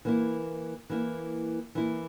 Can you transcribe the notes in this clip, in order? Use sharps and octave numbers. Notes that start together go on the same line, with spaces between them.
E3 A#3 E4
E3 A#3 E4
E3 A#3 E4